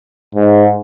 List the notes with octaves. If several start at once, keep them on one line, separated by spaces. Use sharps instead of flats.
G#2